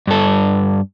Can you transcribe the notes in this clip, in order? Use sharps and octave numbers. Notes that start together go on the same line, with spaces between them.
G2 A4